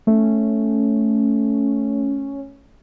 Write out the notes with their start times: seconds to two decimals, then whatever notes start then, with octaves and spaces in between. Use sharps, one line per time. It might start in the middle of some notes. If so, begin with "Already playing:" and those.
0.07 A3 C#4